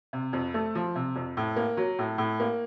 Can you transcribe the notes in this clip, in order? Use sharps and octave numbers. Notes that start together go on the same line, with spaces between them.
C3
F2
A3
F3
C3
F2
A2
A#3
F#3
A2
A2
A#3